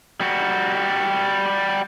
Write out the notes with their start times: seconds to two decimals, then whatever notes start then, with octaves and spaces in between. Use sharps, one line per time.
0.21 G3 F#4